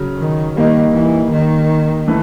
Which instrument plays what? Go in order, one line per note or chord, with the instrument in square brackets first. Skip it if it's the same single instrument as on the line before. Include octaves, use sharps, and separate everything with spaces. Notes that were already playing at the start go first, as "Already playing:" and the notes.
Already playing: [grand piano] C#3 F#3
[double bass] D#3
[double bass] D#3 [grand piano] G3 A#3 D#4
[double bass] E3
D#3
[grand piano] E3 A3